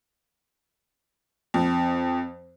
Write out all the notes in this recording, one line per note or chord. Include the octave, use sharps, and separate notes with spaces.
F2